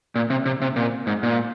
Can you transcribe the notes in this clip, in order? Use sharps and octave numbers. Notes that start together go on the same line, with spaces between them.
A#2
C3
C3
C3
A#2
G#2
A#2